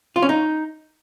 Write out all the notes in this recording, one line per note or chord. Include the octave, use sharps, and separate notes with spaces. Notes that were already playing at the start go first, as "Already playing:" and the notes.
F4
C#4
D#4